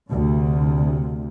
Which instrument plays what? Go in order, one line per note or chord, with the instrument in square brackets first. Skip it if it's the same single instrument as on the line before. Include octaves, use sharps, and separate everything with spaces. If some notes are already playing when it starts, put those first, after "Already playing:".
[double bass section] D2 C3